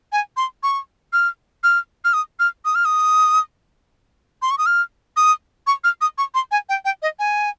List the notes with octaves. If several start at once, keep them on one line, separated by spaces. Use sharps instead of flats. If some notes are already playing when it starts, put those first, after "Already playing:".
G#5
C6
C#6
F6
F6
F6
D#6
F6
D#6
F6
D#6
C6
C#6
D#6
F6
D#6
C#6
F6
D#6
C#6
C6
G#5
G5
G5
D#5
G#5